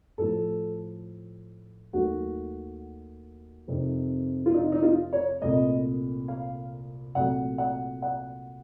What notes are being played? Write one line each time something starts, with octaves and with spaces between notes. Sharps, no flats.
A2 F3 A3 A4
D#2 D#3 F#3 A3 F#4
F2 C3 D#3
F4
D#4
D#4
F4
C#5
C2 A#2 A3 D#5
F5
C2 A#2 F#3 A3 F#5
F#5
F#5